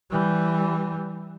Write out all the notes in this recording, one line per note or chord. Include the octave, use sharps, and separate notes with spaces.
E3 G3